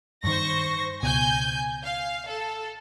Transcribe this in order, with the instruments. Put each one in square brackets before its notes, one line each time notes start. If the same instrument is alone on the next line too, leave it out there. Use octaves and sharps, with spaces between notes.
[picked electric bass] G2 D#3 [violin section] C5 C#6 A#6
[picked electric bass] C#2 B2 [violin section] G#5 G6
[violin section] F5
A4